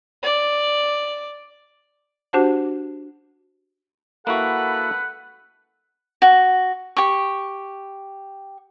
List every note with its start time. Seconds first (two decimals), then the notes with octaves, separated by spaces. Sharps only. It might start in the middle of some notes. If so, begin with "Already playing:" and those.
0.23 D5
2.33 D4 F#4 G4 C5 F#5 A5
4.27 A#3 E4 F#4 A4 B4 F#5
6.22 F#4
6.97 G4 C#6